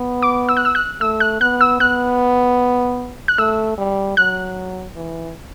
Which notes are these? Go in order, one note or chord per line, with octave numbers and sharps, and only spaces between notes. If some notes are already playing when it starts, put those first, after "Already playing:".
Already playing: B3
D6
E6
F#6
E6
F#6
A3 E6
F#6
B3 F#6
E6
B3 F#6
F#6
A3 E6
G3
F#3 F#6
E3